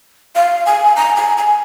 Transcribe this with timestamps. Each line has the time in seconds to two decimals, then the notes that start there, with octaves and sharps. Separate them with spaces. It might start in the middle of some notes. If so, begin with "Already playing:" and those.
0.36 F5
0.66 G#5
0.96 A#5
1.16 G#5
1.37 G#5